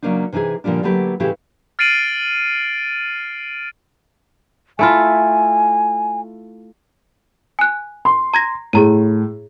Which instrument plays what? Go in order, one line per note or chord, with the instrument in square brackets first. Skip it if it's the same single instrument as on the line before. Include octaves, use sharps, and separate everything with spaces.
[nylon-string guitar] C#3 F#3 A#3 D4 D#4
C3 E3 D#4 E4 G#4
A#2 D3 F3 G3 D4
D3 F#3 A3 A#3 G4 B4
A2 C#3 E3 G#3 E4 G4
[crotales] F6 A6 C7 D7 D#7 F#7
[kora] A3 E4 F4 [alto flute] G#5
[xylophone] G#5 F#6
[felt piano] C6
[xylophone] A#5 G#6 A#6
[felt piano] A2 [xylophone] G#4 A#5 D#7